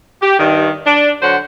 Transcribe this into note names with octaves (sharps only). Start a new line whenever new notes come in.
G4
G2 D#3
D4
D3 F#3 C5 C#5 F#5